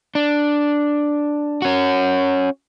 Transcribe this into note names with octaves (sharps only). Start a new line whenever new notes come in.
D4
C#4 F#4